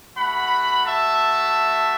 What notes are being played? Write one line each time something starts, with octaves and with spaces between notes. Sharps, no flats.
A3 F#4 F#5 B5
E5 A5